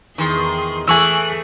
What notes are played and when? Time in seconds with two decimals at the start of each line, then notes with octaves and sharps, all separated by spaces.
0.18 E2 D#3 E3 G#4 C6
0.88 E3 A3 G#4 G#5 C#6 E6 F#6